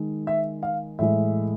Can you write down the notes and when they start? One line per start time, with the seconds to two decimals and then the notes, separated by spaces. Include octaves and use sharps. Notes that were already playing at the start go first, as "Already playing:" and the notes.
Already playing: D#3 G#3
0.27 E5
0.63 F5
0.99 A2 E3 G#3 E5